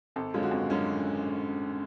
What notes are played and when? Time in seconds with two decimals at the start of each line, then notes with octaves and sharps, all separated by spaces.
0.16 G#1 A4
0.34 F#2 D3 G#3 C#4 F4
0.43 F#4
0.51 G#1
0.70 F#2 D3 G#3 C#4